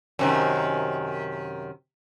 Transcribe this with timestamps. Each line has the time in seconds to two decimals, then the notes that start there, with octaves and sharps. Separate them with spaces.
0.19 F#2 C3 D#3